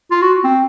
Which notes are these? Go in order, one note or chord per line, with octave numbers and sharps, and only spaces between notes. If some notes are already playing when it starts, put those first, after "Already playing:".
F4
F#4
C4